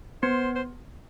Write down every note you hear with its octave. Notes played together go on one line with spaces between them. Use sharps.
B3 C5
C5